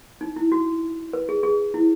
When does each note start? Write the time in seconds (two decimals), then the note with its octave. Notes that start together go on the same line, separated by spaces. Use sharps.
0.21 D#4
0.36 E4
0.52 F#4
1.13 B4
1.29 G#4
1.43 G#4
1.74 E4